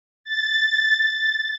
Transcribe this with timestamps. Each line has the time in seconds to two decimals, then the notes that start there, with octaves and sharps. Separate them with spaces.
0.24 A6
1.11 A6